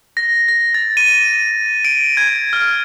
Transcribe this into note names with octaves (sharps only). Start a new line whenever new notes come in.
A#6
A#6
A6
D#7
D7
G#6
F6